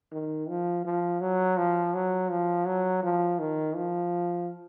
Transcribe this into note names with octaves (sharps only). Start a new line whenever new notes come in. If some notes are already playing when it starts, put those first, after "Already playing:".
D#3
F3
F3
F#3
F3
F#3
F3
F#3
F3
D#3
F3